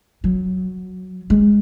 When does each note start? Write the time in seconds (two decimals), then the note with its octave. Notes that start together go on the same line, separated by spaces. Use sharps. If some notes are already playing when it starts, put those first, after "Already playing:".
0.24 F#3
1.30 G#3